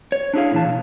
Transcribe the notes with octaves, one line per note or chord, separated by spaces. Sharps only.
C#5
D4 E4 G#4 F5
A#2 E3 A5
B2